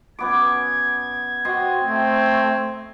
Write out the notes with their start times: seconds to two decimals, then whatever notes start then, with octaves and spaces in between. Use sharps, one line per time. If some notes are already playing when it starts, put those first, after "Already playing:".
0.19 F#2 B3 D6 G#6
1.45 F#4 C5 D#5 G5
1.81 A3 C4